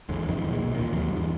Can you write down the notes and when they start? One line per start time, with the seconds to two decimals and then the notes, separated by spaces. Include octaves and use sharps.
0.09 G#1 E2 D3 G#3
0.27 F2 G#2 D#3 E3
0.50 B1 A#2 G#3
0.75 E2 A#2 D#3
0.91 D#2 G#2 D#3 F#3
1.10 E2 G2